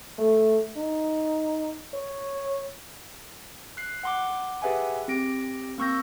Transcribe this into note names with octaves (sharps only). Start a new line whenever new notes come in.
A3
D#4
C#5
F#6 C7
F#5 C6 D6
G4 G#4 B4 E5 F#5 G#5
C4 G4 A#6 D7
A#3 C4 C#6 E6 G6 A#6